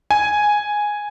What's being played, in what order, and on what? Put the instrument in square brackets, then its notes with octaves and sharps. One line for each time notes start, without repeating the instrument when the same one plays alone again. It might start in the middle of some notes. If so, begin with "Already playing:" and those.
[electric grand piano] G#5